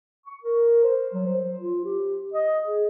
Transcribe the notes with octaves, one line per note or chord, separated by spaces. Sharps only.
C#6
A#4
C5
F#3
C5
F4
G4
D#5
G#4